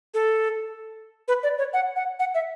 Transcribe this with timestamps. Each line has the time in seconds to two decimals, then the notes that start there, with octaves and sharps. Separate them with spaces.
0.14 A4
1.28 B4
1.43 D5
1.58 C#5
1.73 F#5
1.96 F#5
2.19 F#5
2.34 E5